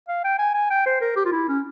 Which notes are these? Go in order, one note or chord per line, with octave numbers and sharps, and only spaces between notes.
F5
G5
G#5
G#5
G5
C5
A#4
G4
F4
E4
C#4